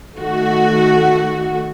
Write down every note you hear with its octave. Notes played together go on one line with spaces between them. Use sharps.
D#3 A3 F#4